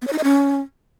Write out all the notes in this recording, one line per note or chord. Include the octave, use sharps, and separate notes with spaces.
B3
C#5
D#4
D#5
C#4